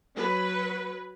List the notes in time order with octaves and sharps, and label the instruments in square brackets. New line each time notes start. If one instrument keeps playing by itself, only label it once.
[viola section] F#3 B4